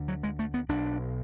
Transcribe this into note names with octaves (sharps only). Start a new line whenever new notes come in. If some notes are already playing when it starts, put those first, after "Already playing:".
Already playing: D2 D3
F#3
G#3
A3
B3
B1 B2 D4